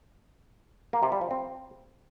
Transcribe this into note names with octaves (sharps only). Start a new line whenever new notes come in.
A#3
C3
G3
F3
C4